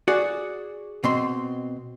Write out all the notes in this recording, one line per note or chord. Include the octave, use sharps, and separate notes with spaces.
F#4 G#4 D5
B2 C4 C6